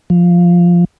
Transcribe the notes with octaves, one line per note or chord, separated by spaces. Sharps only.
F3